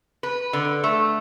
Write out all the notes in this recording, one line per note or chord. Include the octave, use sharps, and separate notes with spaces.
B4
D3
A3